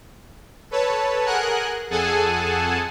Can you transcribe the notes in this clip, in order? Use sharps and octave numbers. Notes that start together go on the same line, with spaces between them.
A4 B4 C#5 A5
G#4 A#4 F#5 G#5 F#6
F2 G#4 A4 F#5 G#5 A5